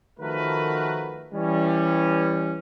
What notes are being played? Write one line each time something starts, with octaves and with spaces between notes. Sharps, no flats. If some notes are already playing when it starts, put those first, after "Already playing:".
D#3 F3 A3 F#4 A#4 B4
E3 G3 C#4